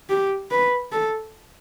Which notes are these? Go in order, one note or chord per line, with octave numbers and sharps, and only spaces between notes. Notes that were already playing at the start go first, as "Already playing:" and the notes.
G4
B4
A4